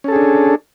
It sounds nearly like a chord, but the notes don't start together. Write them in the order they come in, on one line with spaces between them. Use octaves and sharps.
C#4 A4 G#4 D4